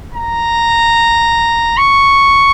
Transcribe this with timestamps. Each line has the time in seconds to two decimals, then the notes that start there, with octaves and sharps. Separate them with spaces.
0.15 A#5
1.77 C#6